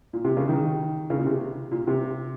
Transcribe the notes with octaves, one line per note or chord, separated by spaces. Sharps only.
A#2
C3
C#3
D#3
C#3
A#2
C3
A#2
C3